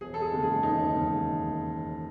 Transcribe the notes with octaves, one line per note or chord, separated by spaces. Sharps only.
E1 G#4
A4
G#4
D#2 C#3 G#3
G#4
E1 D#4
D#2 C#3 G#3